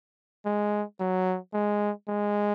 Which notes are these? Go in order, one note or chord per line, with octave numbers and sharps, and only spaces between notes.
G#3
F#3
G#3
G#3